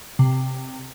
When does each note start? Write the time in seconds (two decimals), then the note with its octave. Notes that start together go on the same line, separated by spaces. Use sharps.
0.19 C3